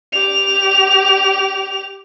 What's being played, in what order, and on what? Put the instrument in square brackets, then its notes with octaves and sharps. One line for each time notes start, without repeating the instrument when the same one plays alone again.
[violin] G4 F7